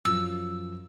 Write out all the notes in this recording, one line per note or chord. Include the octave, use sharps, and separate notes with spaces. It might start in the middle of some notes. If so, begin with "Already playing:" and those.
F#2 F3 E6